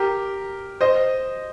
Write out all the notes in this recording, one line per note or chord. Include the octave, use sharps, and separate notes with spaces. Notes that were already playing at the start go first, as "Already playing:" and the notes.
Already playing: G4 A#4
C5 D#5